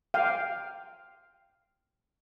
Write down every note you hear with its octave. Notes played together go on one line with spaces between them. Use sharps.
F5 G5